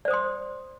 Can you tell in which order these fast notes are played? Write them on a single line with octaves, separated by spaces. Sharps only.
D5 C5 D#6 C6